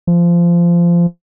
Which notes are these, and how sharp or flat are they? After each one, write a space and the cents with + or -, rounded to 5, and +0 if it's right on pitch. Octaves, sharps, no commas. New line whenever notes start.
F3 -20